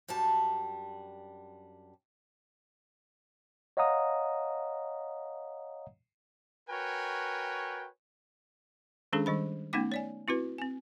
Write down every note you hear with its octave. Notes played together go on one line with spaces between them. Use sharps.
F#2 G3 D4 A5
C#5 D#5 F5 F#5 A#5 D#6
F#4 A#4 B4 C#5 G5 G#5
D#3 G#3 C#4 D4 G#4 A4
D#3 G3 C5 B5
A3 B3 C#4 D#4 G5 D6
C#5 D5 G#5
C4 E4 F#4 B4
C4 G#5